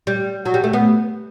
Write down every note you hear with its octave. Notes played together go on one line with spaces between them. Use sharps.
G3
F#3
G3
A3
B3